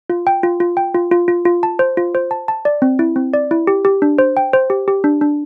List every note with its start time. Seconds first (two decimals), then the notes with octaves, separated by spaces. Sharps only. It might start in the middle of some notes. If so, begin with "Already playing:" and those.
0.10 F4
0.27 G5
0.43 F4
0.60 F4
0.77 G5
0.94 F4
1.11 F4
1.28 F4
1.45 F4
1.63 A5
1.79 C5
1.97 F4
2.15 C5
2.31 A5
2.48 A5
2.65 D5
2.82 C4
2.99 E4
3.16 C4
3.34 D5
3.51 E4
3.67 G4
3.85 G4
4.02 D4
4.18 C5
4.37 G5
4.53 C5
4.70 G4
4.88 G4
5.04 D4
5.21 D4